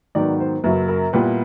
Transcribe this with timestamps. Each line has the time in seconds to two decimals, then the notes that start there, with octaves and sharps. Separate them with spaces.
0.15 G#2 D#3 F#3 B3 D5
0.40 C5
0.64 F#2 C#3 F#3 A#3 B4
0.88 A#4
1.13 A#2 G3 B3 E4 B4